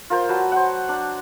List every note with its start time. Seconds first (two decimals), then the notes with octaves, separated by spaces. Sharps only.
0.10 F4 A#4 C5
0.29 F#3 B4 A5
0.52 C5 F#5
0.88 D4